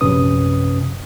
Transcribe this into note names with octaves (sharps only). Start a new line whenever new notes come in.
A#1 F#2 C3 C#4 B4 D#6